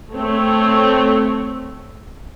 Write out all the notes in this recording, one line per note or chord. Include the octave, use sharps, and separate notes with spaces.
A3 C4 C#5